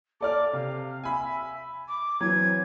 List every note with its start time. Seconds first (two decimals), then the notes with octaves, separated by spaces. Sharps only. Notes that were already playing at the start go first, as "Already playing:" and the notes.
0.21 A4 D5 D6 F6
0.53 C3 F5
1.04 E5 G#5 B5
1.88 D6
2.20 E3 F#3 C4 G#6